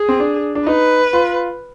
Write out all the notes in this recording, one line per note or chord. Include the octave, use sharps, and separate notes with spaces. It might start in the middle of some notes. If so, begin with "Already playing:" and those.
Already playing: G#4
C4
D4
D4
D#4 B4
F4